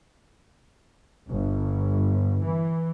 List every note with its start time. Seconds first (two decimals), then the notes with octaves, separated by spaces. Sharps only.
1.31 G1
2.44 E3